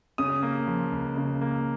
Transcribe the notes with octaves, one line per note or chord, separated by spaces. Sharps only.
C#3 D#6
A#3
F3
C#2
C#3
A#3